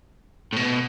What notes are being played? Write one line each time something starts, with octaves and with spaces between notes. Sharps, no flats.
A2
B2